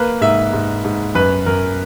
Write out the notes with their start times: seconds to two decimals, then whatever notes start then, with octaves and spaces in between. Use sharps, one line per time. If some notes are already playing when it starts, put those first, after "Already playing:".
Already playing: A#3 B4
0.21 G#2 E5
0.53 G#2
0.85 G#2
1.15 F#2 B4
1.46 F#2 A#4